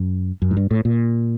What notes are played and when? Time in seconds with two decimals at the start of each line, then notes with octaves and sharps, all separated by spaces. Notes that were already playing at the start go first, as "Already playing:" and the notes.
Already playing: F#2
0.42 F#2
0.51 G#2
0.57 G2
0.71 A2
0.85 A#2